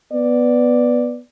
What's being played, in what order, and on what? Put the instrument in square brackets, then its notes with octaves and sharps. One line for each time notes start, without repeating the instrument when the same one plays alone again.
[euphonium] B3 [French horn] D5